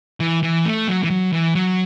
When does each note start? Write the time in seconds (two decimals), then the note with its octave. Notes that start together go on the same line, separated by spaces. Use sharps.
0.20 E3
0.43 E3
0.65 A3
0.88 F#3
1.03 E3
1.10 F#3
1.33 E3
1.55 F#3